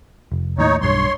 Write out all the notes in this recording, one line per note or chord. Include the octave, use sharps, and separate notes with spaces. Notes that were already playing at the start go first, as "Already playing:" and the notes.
F1
D#2 A2 D#4 C#5
B1 G2 C#5 C6